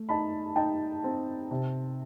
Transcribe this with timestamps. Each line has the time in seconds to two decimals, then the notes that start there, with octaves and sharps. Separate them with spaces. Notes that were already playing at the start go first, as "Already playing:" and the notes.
Already playing: A3
0.09 D#4 A5 B5
0.56 D#4 G5 A5
1.04 C4
1.51 C3